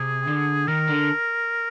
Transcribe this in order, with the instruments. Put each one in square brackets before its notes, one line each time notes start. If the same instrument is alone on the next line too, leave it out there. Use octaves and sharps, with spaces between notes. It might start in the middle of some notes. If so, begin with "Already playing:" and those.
Already playing: [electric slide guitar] C3 [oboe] G#4
[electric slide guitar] D3
[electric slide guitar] D#3 [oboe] A#4
[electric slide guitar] D3